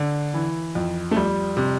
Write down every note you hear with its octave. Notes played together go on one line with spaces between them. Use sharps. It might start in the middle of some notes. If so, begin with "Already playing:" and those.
Already playing: D3
E3
F2
A3
F2 G3
C3